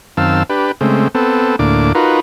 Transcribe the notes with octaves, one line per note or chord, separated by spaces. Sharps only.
F#2 D#3 C4 F5 A5 E6
D4 G4 B4
C#3 G#3 A3 C4
B3 C4 A4
D2 A2 A#3 D4 D6
D#4 F4 F#4 A#4 B4